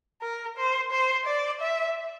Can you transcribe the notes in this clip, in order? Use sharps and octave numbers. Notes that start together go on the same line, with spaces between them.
A#4
C5
C5
D5
E5